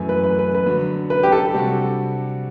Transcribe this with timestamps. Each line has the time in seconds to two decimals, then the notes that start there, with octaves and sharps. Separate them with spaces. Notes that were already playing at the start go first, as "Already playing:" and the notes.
Already playing: F#2 E3 A3
0.09 B4
0.23 B4
0.39 B4
0.54 B4
0.66 D3 F#3 B3
1.10 B4
1.23 G4
1.32 A4
1.54 C3 G3 D4 F#4